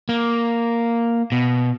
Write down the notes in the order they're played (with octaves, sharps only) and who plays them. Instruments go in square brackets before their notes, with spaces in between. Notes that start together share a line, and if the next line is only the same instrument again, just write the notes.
[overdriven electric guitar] A#3
B2